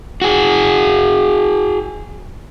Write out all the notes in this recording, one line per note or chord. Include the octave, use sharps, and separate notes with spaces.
F#4 G#4